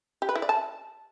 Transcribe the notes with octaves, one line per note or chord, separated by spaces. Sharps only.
G4
B4
E4
D5
A5